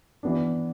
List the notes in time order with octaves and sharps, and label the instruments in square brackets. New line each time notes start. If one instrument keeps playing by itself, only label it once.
[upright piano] E3 B3 D4